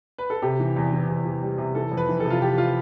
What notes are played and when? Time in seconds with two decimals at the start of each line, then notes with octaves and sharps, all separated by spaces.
0.18 B4
0.30 A4
0.42 C3 G4
0.60 E3
0.76 E2
0.93 E3
1.09 E2
1.25 E2
1.42 G3
1.58 C3
1.75 E3 A4
1.92 F2
1.97 B4
2.09 E3
2.20 C3 A4
2.30 F4
2.41 C3 G4
2.58 F4